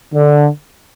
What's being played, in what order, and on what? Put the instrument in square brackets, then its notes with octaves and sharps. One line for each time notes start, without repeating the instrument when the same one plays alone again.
[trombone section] D3